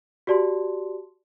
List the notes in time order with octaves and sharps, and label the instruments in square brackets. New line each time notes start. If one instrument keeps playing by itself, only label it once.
[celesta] F#4 G4 D5 A5 C6